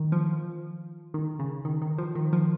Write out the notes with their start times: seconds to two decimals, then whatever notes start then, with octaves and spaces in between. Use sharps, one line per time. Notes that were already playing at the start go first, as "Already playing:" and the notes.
Already playing: D#3
0.12 F3
1.14 D#3
1.39 C#3
1.65 D#3
1.82 D#3
1.98 F3
2.15 D#3
2.33 F3